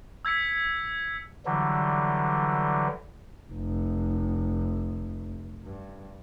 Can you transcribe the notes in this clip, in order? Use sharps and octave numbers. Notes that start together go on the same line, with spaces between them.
E6 G#6 B6 C#7
D3 E3 F#3 G3
F1
G2